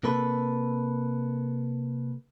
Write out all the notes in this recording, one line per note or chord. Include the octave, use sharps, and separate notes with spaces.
C3 A#3 A4 B4